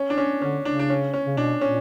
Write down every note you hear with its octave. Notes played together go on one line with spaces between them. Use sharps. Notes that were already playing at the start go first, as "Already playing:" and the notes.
Already playing: C#4
D4
C#4
D3 C#4
C#3 D4
D4
C#4
C#4
C#3
B2 D4
A#2 C#4